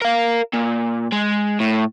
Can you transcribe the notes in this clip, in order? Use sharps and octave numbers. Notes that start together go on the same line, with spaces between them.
A#4 F5
A#2
G#3
A2